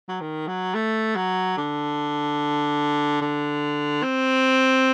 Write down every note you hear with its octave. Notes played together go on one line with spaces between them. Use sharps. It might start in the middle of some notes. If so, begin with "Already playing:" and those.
F#3
D#3
F#3
A3
F#3
D3
D3
C4